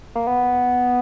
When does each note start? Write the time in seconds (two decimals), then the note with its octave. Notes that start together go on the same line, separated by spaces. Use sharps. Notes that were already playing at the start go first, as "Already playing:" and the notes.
0.15 A#3
0.27 B3